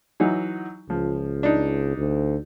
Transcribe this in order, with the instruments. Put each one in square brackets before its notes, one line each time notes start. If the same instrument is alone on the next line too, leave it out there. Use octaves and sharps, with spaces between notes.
[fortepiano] E3 F#3 D#4
[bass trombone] C#2 [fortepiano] F3
[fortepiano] D4 D#4
[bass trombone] D2